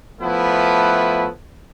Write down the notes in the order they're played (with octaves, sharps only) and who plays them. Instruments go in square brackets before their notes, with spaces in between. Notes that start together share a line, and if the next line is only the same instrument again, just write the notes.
[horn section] F3 A3 B3 E4 B4